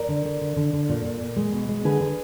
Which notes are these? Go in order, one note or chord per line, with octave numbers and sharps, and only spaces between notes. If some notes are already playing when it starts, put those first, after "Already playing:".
Already playing: A#4 D5
D3
D3
D3
D3
D3
A#2
A#2
A#2
G#3
B2
G#3
D3 G#4 B4
D3